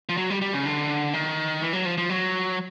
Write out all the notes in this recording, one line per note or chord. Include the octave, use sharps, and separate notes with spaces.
F3
F#3
G3
G3
C#3
D3
D#3
E3
F#3
F3
F3
F#3